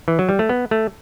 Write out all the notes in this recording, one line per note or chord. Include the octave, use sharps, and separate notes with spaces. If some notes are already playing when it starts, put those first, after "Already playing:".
E3
F#3
G3
A3
B3
A3